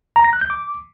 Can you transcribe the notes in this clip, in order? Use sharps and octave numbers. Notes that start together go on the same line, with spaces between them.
A#5
A#6
F#6
G6
D6